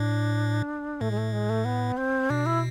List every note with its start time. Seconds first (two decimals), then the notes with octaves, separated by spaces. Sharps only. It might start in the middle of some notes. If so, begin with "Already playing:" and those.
Already playing: A2 D4
1.01 A2 A3
1.11 G#3
1.18 A3
1.33 G#3
1.50 A3
1.65 B3
1.97 C4
2.30 B2 D4
2.46 E4